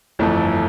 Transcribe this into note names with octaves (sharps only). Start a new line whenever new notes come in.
G1 F2 E3 A3